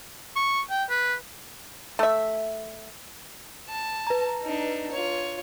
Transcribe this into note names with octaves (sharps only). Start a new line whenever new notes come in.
C#6
G5
B4
A3 E5
A5
B4 A#5
D4 D#4
F4 C#5